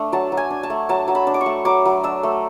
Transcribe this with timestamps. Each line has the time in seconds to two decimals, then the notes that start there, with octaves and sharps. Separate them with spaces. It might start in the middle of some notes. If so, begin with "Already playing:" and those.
Already playing: A3 D4
0.12 F#3 A5
0.32 F#3
0.37 G#5
0.50 D4
0.63 A5
0.70 A3
0.89 F#3 A5
1.08 F#3
1.15 B5
1.27 D4
1.34 D6
1.41 C#6
1.46 A3
1.65 F#3 D6
1.85 F#3
2.03 D4 E6
2.23 A3